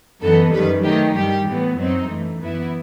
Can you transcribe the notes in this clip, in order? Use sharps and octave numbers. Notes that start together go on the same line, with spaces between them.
F#2 E3 B3 D#4 A4
F#2 D#3 G3 B4
D#3 F#3 A3 D#4 G4
G2 D#3 G3 G4
A2 E3 B3
F#2 F#3 C4 D#4
F#2 E3 A3
F#2 E3 B3 E4